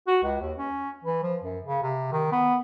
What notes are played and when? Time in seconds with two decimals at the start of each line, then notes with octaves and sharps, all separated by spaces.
0.08 F#4
0.23 C#2
0.41 D#2
0.58 C#4
1.04 E3
1.23 F3
1.43 F#2
1.65 C#3
1.83 C3
2.12 D#3
2.32 B3